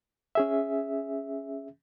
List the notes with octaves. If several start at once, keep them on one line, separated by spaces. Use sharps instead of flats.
C#4 G#4 E5